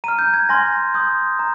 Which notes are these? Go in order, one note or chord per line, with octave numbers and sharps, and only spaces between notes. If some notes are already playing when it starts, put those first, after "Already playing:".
A#5 F6 D#7
G6
G#6
G#5 C6 F6 A#6
C6 D#6 G6
A#5